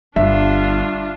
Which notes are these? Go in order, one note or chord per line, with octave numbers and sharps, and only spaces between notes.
G1 G2 D4 F4 E5